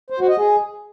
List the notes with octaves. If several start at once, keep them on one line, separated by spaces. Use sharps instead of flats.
C5
F#4
D#5
G#4